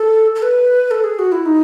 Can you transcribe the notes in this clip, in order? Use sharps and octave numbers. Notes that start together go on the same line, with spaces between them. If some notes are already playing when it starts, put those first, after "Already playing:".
Already playing: A4
A4
B4
A4
G#4
F#4
E4
D#4